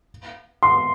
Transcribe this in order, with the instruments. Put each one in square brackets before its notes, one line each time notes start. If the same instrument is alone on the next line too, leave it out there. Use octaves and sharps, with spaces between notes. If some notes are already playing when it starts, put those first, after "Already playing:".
[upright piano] C6